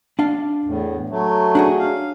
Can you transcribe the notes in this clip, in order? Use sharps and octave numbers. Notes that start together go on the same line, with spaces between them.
D4 F5
E2 A2
F#3 A3
D4 F#4 G#4
F5